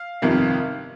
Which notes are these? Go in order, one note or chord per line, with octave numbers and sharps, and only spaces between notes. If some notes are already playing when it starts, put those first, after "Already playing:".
Already playing: F5
G1 F2 C3 D#3